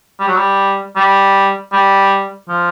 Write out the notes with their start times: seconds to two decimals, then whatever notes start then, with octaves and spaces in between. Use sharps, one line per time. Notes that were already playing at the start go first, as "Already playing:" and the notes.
0.20 G3
0.28 F#3
0.37 G3
0.96 G3
1.73 G3
2.49 F3